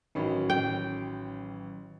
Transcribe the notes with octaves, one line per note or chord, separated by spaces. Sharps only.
A1 D#3 F#3 C#4 B5
G5